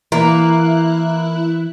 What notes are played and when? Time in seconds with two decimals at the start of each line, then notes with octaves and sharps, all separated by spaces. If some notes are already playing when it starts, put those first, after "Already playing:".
0.12 E3 A#3 E4 F#6